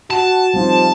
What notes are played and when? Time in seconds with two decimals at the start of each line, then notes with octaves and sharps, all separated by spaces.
0.10 F#4 A5
0.54 F3 G3 C4 D#4